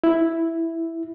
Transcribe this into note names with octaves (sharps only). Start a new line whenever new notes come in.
E4